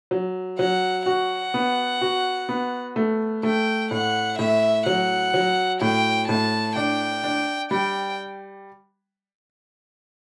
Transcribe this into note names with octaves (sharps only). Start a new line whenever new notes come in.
F#3
F#3 F#5
F#4 F#5
B3
F#4
B3
A3
A3 G5
A2 F#5
A2 E5
F#3 F#5
F#3
A2 G5
A2 A5
D4 G5
D4
G3 G5